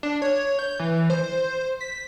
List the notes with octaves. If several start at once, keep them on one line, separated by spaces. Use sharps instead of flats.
D4
C#5
G6
E3
C5
B6